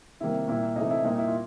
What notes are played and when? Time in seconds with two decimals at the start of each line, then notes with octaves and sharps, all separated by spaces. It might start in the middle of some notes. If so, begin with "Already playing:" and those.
0.20 C3 D#3 G3 A#3 E4
0.48 A#2 G3 A#3 E4
0.76 C3 E3 A3 D#4
0.91 E4
1.04 A#2 G3 A#3 D#4
1.18 E4
1.28 F4